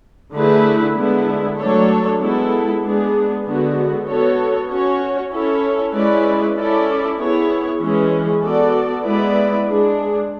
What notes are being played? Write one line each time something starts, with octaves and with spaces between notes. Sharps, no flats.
D3 A3 E4 G#4 B4
D3 G#3 B3 E4
F#3 A3 D4 A4 C#5
G#3 B3 E4 A4
G#3 B3 D4 G#4
D3 G#3 B3 F#4
B3 F#4 A4 C#5
C#4 F#4 C#5
C#4 E4 A4 C#5
G#3 C#4 E4 B4 D5
C#4 E4 A4 D5
B3 E4 G#4 C#5
E3 G#3 C#4 G#4
B3 F#4 A4 D5
G#3 B3 E4 B4 D5
G#3 D4 G#4